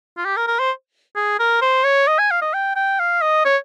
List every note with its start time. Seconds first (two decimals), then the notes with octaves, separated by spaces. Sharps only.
0.17 F4
0.25 G4
0.37 A#4
0.47 A#4
0.59 C5
1.16 G#4
1.40 A#4
1.62 C5
1.84 C#5
2.08 D#5
2.19 G#5
2.31 F5
2.42 D#5
2.54 G5
2.76 G5
2.99 F5
3.22 D#5
3.45 C#5